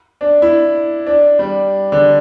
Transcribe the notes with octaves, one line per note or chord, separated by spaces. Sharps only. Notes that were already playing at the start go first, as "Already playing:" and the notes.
D4
E4
D4
G3
D3